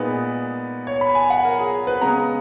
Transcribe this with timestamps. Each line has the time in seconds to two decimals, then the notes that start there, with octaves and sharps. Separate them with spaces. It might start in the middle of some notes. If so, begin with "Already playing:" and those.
Already playing: A#2 G#3 B3 D#4 B4
0.87 C#5
1.01 B5
1.15 G#5
1.30 F#5
1.45 A#4
1.59 G#4
1.87 B4
2.01 C#3 G#3 B3 A#5